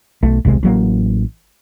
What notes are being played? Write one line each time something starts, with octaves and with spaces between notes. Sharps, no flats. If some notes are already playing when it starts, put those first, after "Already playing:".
B1 A3
D#1 B1 C3 G#3
A1 F#3 A#3